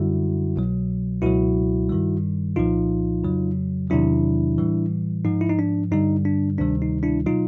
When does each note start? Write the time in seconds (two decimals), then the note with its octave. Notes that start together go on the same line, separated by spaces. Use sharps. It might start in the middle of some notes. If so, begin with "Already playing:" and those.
Already playing: F#2 D3 G3 E4 F#4
0.56 C2 B2 F#3
1.22 C#2 B2 F#3 E4 F#4
1.90 G2 D#3 G3
2.56 C2 A#2 F3 D#4 F4
3.24 F2 C#3 F#3
3.90 E2 C3 D#3 F#3 D4 E4
4.58 A2 E3 G3
5.25 G#2 F3 D#4
5.41 E4
5.49 D#4
5.59 D4
5.91 G2 D3 G3 D#4
6.25 D4
6.58 D2 C3 D#3 G3 D4
6.82 D#4
7.03 D4 E4
7.26 B2 F#3 D#4 F4